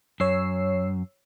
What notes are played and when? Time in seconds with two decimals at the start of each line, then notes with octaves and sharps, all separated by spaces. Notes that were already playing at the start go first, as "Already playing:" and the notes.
0.20 F#2 C#5 E6 C7